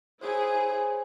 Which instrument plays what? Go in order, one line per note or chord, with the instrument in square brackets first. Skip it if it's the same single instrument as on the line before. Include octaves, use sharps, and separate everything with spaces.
[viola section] E4 G#4 [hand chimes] C5 C#5 G#5